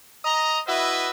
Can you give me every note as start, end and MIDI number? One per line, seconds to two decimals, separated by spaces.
0.25 0.60 75
0.25 0.60 82
0.67 1.10 64
0.67 1.10 66
0.67 1.10 71
0.67 1.10 75
0.67 1.10 76